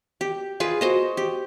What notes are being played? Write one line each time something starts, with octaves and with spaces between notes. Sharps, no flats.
G4
F4 G#4 B4
F#4 C5 D#5
G4